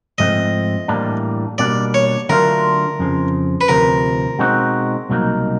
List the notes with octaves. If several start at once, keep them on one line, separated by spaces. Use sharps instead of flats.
G#2 F3 A3 C4 D#5
A2 E3 G3 A#3 D4
B2 G3 A#3 D4 D5
C#5
D3 F#3 A3 D4 F4 A#4
F2 C#3 F3
B4
D2 C3 F3 A#4
B2 G#3 C4 D#4 F#4
C2 B2 F#3 A#3 D#4